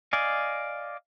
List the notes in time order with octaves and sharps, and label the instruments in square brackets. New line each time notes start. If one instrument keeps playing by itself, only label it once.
[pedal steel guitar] D5 D#5 F5 G#5